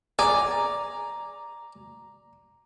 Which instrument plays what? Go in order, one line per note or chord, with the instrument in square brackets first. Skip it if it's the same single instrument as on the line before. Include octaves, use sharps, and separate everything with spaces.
[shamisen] G#4 [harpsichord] D5 [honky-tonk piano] A#5